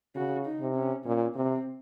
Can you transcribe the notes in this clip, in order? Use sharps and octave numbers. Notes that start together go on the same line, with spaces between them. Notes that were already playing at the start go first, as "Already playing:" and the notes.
C#3 F#4
D#4
C3
C#4
A#2 C#4
C3 C4